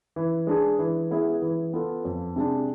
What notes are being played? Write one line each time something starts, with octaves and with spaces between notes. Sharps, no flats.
E3
G#3 D4 G#4
E3
G#3 B3 E4 G#4
E3
B3 F4 A4
F2
C3 G#3 D4